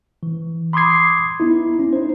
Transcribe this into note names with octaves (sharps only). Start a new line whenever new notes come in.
E3
B5 C6 D6 D#6 G#6 C7
B3 D#4 E4
C#4
D#4 C5